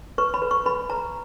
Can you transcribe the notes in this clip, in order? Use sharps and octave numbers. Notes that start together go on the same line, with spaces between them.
B4 C#6
B5
B4
C#6
B4 B5
B4 A#5